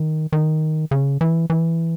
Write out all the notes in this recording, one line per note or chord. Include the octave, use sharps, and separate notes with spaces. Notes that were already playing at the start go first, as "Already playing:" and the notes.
Already playing: D#3
D#3
C#3
E3
E3